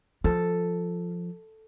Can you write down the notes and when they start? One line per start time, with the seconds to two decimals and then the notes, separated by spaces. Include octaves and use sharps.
0.24 F3 F4 A4